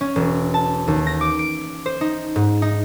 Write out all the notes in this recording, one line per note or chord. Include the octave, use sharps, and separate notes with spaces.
C#4
E1
A5
D#2
A#6
D6
D7
C5
D#4
G#2
D#4